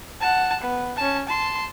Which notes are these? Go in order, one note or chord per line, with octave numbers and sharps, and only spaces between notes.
F#5 A5
B3
C#4 A5
A5 C6